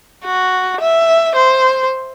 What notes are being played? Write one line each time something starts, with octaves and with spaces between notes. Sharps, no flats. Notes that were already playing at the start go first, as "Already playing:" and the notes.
F#4
E5
C5